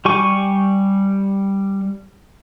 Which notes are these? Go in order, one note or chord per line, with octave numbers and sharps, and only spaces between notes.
G3 G4 G#5 C#6 D6